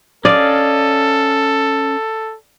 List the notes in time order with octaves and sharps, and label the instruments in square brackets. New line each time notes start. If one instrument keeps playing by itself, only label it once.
[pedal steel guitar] C#4 D#5 F5 [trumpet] A4 [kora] D5